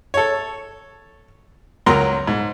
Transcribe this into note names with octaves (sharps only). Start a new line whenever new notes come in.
A4 C#5
C#2 F#3 A#4 A#5 C6
G#2